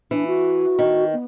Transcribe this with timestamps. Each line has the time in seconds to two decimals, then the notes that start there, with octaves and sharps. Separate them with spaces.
0.11 E3 D4
0.27 F#4
0.79 D#3
1.13 B3